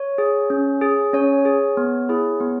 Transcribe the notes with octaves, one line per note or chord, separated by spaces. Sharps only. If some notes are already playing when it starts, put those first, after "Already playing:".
Already playing: C#5
G#4
C#4
G#4
C#4 C#5
G#4
B3
E4 G#4
B3